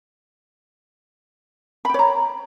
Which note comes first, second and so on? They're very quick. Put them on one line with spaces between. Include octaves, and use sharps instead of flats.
B5 G5 C#5 A#5